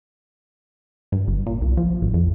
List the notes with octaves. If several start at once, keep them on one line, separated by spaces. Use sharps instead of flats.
G2
G1
A#2
C2
F3
A1
F2